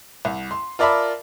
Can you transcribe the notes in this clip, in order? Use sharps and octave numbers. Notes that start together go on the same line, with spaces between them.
C2
C6
F4 A#4 D5 E5 A5 B5